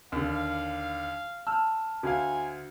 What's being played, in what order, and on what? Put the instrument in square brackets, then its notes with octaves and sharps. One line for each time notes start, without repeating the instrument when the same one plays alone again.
[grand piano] D#2 D3 [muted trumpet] F5
[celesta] A5 [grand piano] E6 F6
[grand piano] D2 F5 [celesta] F#4 [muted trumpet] G#5